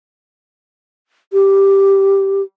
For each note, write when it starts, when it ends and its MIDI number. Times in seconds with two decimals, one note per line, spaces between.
1.33 2.42 67